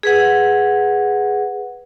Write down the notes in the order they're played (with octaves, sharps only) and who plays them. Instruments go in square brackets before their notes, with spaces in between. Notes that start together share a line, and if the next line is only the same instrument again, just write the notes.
[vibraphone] G#4 B4 F#5